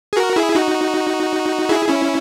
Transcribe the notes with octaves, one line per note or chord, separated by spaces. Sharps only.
G#4
F#4 A#4
E4 G#4
D#4 F#4
E4 G#4
C#4 E4